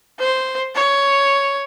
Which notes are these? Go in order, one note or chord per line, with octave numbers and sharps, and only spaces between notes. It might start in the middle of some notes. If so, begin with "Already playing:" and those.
C5
C#5